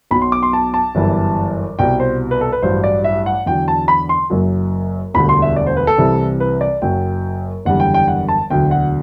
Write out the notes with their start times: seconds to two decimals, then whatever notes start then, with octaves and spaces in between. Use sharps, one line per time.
0.11 B1 B2 F#3 B5
0.21 C6
0.32 D6
0.43 C6
0.53 A5
0.74 A5
0.95 G1 F#2 E3 G3
1.79 C2 B2 G3 G5
2.00 C5
2.31 B4
2.41 A4
2.52 B4
2.62 A1 G2 F#3 C5
2.84 D5
3.04 E5
3.26 F#5
3.46 E2 D3 F#3 G5
3.68 A5
3.88 B5
4.09 C6
4.30 F#1 F#2 F#3
5.14 E1 D2 D3 G3 B5
5.29 C6
5.42 E5
5.56 D5
5.67 C5
5.77 B4
5.87 A4
5.98 C2 C3 E3 G3
6.40 B4
6.61 D5
6.82 F#1 F#2 F#3 G5
7.65 F#1 E2 D3 G3 F#5
7.80 G5
7.94 G5
8.08 F#5
8.28 A5
8.50 E1 D2 D3 F#3 G5
8.71 F#5